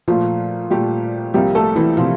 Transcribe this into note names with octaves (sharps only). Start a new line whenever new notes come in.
A#2 F3 A3 F4
A#2 G3 A3 G4
C2 C3 F3 G3 A#3 G4
A3 A4
E3 E4
C3 F3 A#3 F4